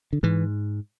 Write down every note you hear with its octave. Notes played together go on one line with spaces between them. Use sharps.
D3
G#2 E3